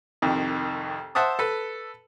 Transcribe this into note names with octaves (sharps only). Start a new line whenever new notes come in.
C2 F2 D#3
C5 E5 F#5 A5 D#6
A4 B4